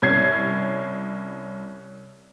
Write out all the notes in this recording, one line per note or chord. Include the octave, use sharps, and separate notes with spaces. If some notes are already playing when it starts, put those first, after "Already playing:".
C2 C#4 G#6 C7